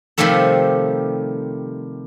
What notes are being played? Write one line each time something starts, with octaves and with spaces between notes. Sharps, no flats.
C3 D#3 F3 G3 A3 A4